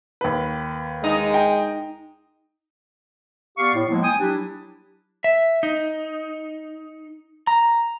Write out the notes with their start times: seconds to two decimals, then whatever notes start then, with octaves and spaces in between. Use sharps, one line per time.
0.21 D#2 B4
1.04 G#3 D#4
1.34 G5
3.58 B3 G4 D5 F5 C#6
3.75 A2
3.89 F3 F#3 G#3 A#3 B3 E4
4.03 G5 G#5 D#6
4.19 F#3 D4 E4 G4
5.24 E5
5.63 D#4
7.47 A#5